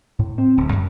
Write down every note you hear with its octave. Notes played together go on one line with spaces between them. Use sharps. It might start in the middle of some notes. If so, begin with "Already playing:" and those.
A2
C4
D1
F#2